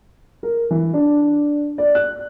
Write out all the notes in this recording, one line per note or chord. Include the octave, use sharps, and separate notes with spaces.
A#4
E3
D4
D5
F#6